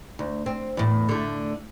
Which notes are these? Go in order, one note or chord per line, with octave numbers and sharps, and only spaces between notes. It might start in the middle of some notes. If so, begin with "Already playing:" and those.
D2
C4
E2 A2
D3 A3